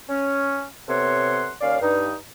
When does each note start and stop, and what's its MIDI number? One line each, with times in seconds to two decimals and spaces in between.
0.09 0.65 61
0.89 1.51 48
0.89 1.51 59
0.89 1.51 69
0.89 1.51 73
0.89 1.51 78
0.89 1.51 84
1.61 1.81 39
1.61 1.81 61
1.61 1.81 74
1.61 1.81 77
1.81 2.13 43
1.81 2.13 63